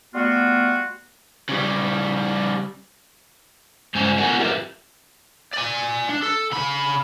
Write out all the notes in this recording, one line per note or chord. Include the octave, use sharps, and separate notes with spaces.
G3 A3 B3 F4 F#4
C#3 G3
G2 C#3 G#3 C#4 C5 G#5
B3 F#4 A4 A#4 F#5 G#5
F4 G4 A#4 B4 E5
D5 G#5
D4
A4
C#3 B5